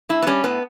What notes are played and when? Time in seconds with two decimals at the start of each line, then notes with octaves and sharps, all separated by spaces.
0.09 A2 E4
0.22 B3
0.27 G3 C#4
0.44 A2 B3